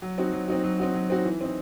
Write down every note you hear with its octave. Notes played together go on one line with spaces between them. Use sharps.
F#3
C4 D#4 F#4
F#3
C4 D#4 F#4
F#3
C4 D#4 F#4
F#3
C4 D#4 F#4
E3
C4 D#4